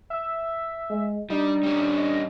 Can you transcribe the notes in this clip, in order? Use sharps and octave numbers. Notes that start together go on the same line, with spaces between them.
E5
G#3
G3 D4 D#4
G3 C#4
D#5